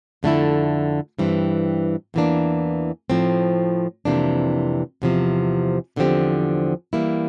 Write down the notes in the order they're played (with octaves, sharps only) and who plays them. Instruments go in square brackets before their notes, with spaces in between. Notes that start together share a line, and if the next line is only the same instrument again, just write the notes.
[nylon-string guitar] F2 D3 A3 E4
G2 E3 G3 C4
E2 E3 A#3 D4
A2 F3 C4
F2 C3 E3 A#3 D4
E2 C3 F3
E2 D3 F3 C4 G4
E3 G3 A#3 E4